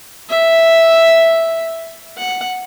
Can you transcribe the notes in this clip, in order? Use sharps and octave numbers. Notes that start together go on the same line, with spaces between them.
E5
F#5